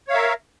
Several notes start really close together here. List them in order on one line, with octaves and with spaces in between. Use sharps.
C#5 F5 E5 A#4